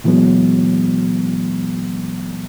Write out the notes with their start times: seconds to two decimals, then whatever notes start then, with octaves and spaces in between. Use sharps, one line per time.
0.04 A#2 E3 F#3 G#3 B3